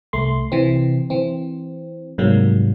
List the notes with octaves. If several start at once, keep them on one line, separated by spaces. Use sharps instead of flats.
C2 A3 C6
C3 E3 C4
E3 C4
G#2 C3 F#3 G3 A#3